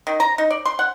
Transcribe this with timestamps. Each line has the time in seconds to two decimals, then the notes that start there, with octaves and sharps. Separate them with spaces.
0.07 D#3
0.20 A#5
0.38 D#4
0.51 D5
0.65 C6
0.79 F#5